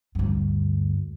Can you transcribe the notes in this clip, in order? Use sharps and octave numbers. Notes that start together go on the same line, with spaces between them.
D2 G2